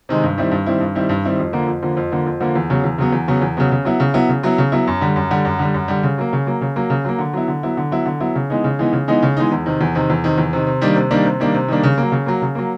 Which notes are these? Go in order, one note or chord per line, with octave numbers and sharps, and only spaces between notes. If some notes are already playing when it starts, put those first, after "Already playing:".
C3 D#3 G#3
G2
D#3 G3 C4 E4
G2
D#3 G3 C4 E4
G2
D#3 G3 C4 E4
G2
D#3 G3 C4 E4
F2
D3 F3 A#3
F2
D3 F3 A#3
F2
D3 F3 A#3
F2
D3 F3 A#3
E2
C#3 F#3 B3
E2
C#3 F#3 B3
E2
C#3 F#3 B3
E2
C#3 F#3 B3
C#3
F#3 B3 E4
C#3
F#3 B3 E4
C#3
F#3 B3 E4
C#3
F#3 B3 E4
F#2
D3 G3
F#2
D3 G3
F#2
D3 G3
F#2
D3 G3
C#3
F#3 A#3
C#3
F#3 A#3
C#3
F#3 A#3
C#3
F#3 A#3
D3
F#3 B3 E4
D3
F#3 B3 E4
D3
F#3 B3 E4
D3
F#3 B3 E4
C#3
E3 G#3 B3 D#4
C#3
E3 G#3 B3 D#4
C#3
E3 G#3 B3 D#4
C#3
E3 G#3 B3 D#4
E2
C3 D#3
E2
C3 D#3
E2
C3 D#3
E2
C3 D#3
C3
D#3 G3 A#3 D4
C3
D#3 G3 A#3 D4
C3
D#3 G3 A#3 D4
C3
D#3 G3 A#3 D4
C#3
F#3 A#3
C#3
F#3 A#3
C#3
F#3 A#3